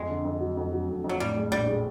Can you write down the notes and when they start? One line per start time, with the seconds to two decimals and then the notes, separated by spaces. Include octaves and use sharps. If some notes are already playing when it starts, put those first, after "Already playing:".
Already playing: F2 G#3
0.09 D3
0.25 F2
0.40 F#3
0.57 F2
0.73 F#3
0.89 F2
1.04 F2
1.09 F#3
1.20 A2 G3
1.36 G#3
1.51 A#1 G3
1.67 G#3